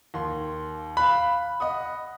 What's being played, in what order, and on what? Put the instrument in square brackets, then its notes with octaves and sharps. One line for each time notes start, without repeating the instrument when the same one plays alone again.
[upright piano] D#2 C6
[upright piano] F5 F#6 [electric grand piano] B5
[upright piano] D#5 F#5 D#6